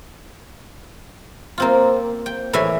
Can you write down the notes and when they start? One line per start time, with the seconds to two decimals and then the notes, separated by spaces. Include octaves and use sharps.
1.58 A#3 C4 F4
2.26 G5
2.53 A2 E3 D5 E5 G#5